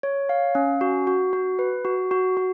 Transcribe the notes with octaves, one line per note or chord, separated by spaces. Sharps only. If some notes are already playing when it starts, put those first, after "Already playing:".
C#5
F5
C#4
F#4
F#4
F#4
B4
F#4
F#4
F#4